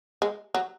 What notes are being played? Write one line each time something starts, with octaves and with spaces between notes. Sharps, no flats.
G#3
F#3